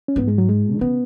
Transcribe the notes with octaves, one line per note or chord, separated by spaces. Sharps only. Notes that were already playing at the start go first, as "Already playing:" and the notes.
C#4
G#2 B3
G#3
F#3
G#3
E3
C#3 B3